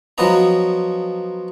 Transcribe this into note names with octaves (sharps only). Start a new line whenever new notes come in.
F3 F#3 B3 C#4 D#5 A#5